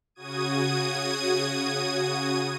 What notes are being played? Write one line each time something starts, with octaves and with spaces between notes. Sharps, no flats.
C#3 F#4 D#6 G#6 D#7